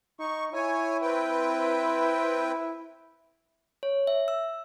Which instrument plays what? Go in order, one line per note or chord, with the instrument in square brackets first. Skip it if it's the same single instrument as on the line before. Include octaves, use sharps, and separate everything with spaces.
[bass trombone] D#4 [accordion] C#6
[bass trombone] E4 [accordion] C#5 G#5
[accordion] C4 B4 G5
[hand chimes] C#5
E5
E6